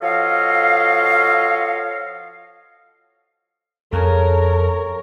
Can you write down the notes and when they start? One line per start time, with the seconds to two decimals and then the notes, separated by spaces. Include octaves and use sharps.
0.02 F3 F#4 A4 C#5 D#5 F5
3.93 F2 C#3 A4 A#4 C#5 G#5